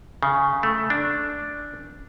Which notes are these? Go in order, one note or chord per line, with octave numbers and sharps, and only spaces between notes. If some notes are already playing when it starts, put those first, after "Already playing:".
C#3
A3
D4